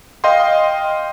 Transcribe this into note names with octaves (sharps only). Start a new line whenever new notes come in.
D#5 F5 G5 C6